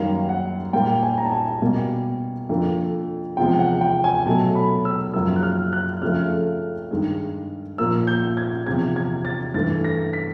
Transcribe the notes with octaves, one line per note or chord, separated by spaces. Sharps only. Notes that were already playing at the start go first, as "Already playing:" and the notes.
Already playing: F#2 D#3 G3 A#3 F5
F#5
A#2 G3 A#3 G5
G#5
A#5
A5
G#5
B2 G3 A#3
F2 D3 F3 A#3
E2 C3 F3 G#3 G5
F#5
G5
G#5
B2 F#3 A3 A5
B5
E6
F#2 C#3 F3 A#3 E6
F#6
F6
F#6
F2 C#3 F3 A3 F6
G2 D#3 G#3
A#2 F3 A#3 E6
G6
G#6
E2 C3 F3 G#6
G#6
A6
G2 E3 A3 A6
A#6
B6